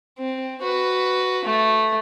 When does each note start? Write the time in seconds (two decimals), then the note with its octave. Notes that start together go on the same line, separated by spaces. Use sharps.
0.19 C4
0.62 F#4 B4
1.45 A3